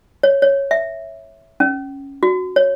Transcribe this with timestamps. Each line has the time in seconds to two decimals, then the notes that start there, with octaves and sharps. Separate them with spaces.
0.23 C#5
0.42 C#5
0.71 E5
1.60 C#4
2.23 F#4
2.56 C#5